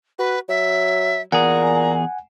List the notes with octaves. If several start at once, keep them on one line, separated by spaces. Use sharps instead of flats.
F#4 B4
F#3 E5
E2 A#2 G#4 F#5 G#5 A#5